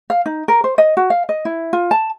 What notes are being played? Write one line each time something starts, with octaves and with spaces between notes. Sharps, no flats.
F5
D#4
A#4
C5
D#5
F#4
F5
D#5
E4
F4
A5